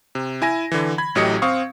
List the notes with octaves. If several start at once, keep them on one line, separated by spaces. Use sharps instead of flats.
C3
E4 G#5 A#6
D3 E3
B5 G#6
A1 A2 F#3 G4 D#5 C#7
C4 F5 C#6 D#6